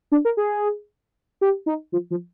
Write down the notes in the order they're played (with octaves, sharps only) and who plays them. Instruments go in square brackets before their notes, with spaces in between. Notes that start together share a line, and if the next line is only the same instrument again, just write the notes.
[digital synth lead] D4
A#4
G#4
G4
D#4
F3
F3